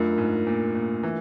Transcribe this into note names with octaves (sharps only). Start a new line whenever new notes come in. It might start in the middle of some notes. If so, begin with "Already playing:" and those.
Already playing: F#2 A3 D4 F4 A#4
G#2
A#2
A#2
E3